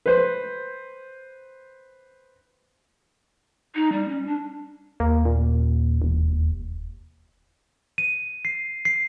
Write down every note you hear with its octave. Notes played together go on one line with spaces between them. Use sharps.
B4 C5
D#4
G3
C#4
D4
D#2 A#3
A#2
E1
D#7
C7
C7